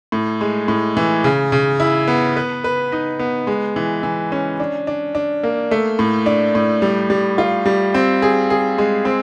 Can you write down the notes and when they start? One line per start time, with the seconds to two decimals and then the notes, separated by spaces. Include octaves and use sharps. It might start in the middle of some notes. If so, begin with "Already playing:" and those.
0.12 A2
0.41 G#3
0.68 A2
0.97 E3
1.24 C#3
1.52 C#3
1.80 E4
2.08 B3
2.37 B4
2.64 B4
2.92 D#4
3.19 B3
3.47 G#3
3.76 E3
4.03 E3
4.32 C#4
4.60 D4
4.87 D4
5.15 D4
5.43 A#3
5.71 A3
5.99 A2
6.26 D4
6.55 A2
6.82 G3
7.10 G3
7.38 F4
7.66 G3
7.94 C4
8.22 G#4
8.50 G#4
8.78 G#3
9.05 C4